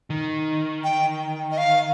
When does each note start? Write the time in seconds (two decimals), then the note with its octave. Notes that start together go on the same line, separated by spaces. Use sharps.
0.10 D#3
0.84 G5
1.51 D#5
1.58 F5